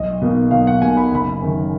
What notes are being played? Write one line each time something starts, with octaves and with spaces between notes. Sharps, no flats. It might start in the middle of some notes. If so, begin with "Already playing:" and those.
Already playing: B1 D#5
B2 A#3 D#4
B1 F5
F#5
B2 A#3 D#4 G#5
B5
F#1 B5
F#2 D#3